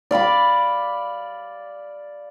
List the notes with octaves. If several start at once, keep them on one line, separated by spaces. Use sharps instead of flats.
D5 F5 B5 D6